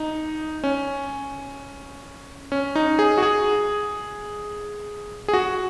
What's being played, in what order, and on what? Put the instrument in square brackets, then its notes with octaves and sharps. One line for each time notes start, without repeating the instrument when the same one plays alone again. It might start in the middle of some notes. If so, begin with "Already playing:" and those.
Already playing: [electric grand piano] D#4
C#4
C#4
D#4
G#4
F#4
G#4
G#4
F#4